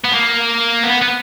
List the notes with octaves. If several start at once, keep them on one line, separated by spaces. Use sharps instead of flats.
B3
A#3
B3
B3